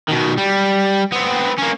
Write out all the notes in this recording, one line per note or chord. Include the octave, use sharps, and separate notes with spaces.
B2 D#3
G3
B3 C4
A#3 C#4